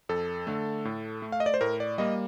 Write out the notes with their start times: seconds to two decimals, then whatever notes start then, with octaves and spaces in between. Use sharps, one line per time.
0.09 F2 A4
0.47 D3 A3
0.85 A2
1.22 A3
1.32 F5
1.40 D#5
1.46 D5
1.54 C5
1.61 A2 A#4
1.80 D5
1.98 G3 A#3 D#5